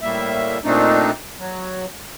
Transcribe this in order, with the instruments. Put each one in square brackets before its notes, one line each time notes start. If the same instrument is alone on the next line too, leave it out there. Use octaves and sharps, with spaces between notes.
[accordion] A2 G3 A#3 E5
A#2 A3 C4 D4 D#4
F#3